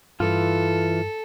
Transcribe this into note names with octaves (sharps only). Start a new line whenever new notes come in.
G2 E3 F4 A4